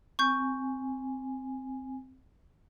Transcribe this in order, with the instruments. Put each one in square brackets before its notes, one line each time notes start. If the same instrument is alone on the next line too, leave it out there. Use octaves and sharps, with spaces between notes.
[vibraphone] C4 G#5 [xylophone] C#6 G6